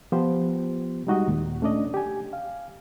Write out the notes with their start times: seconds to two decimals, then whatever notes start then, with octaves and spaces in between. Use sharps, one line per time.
0.12 F3 B3 F4 G4 C5
1.07 G3 G#3 D#4 F#4 G4 D#5
1.28 D#2 A#2
1.62 A3 C#4 D4 D5 D#5
1.94 G4 G#5
2.33 F5